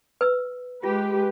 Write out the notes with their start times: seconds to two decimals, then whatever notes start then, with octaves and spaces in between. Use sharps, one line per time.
0.21 B4 E6
0.83 G#3 F4 G4 B4